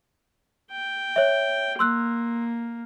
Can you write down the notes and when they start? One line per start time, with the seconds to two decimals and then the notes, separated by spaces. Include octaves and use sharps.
0.71 G5
1.16 C#5 E5
1.79 A#3 C6 E6 F#6